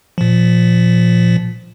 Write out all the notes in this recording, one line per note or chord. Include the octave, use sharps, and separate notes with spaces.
A#2 F3